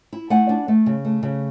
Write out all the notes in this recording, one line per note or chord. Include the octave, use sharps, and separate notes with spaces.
E4
A3 F#5 G#5
D4
A3
C#3
A3
C#3